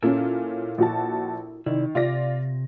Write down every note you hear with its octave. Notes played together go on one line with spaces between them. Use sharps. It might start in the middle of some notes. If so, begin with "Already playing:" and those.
A#2 C#4 E4 A4 A#4
A#1 F#4 A5
C3 D#3 E4 D5
C3 F4 D5 A#6